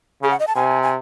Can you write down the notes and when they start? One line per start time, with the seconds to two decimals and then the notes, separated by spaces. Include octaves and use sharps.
0.22 C#3 G#4
0.30 F#5
0.40 D#5
0.47 A5
0.56 C3 G#5
0.83 G#5